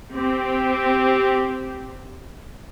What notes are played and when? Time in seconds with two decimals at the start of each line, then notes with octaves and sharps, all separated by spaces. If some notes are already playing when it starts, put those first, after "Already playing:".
0.15 C4 G4